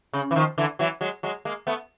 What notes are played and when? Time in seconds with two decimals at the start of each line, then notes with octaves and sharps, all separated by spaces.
0.13 C#3
0.31 E3
0.36 D#3 F3
0.58 D3 E3
0.79 E3 F#3
1.01 F#3 G#3
1.23 F#3 G#3
1.45 G#3 A#3
1.67 A3 B3